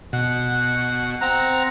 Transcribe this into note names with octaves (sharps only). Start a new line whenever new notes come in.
B2 F#5
C4 F#5 A#5